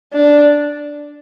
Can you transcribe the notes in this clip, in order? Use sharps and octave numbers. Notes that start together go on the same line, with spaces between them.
D4